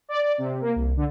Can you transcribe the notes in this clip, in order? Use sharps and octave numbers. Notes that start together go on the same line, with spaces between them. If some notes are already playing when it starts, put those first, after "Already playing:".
D5
D5
C3
A#3
C2
D3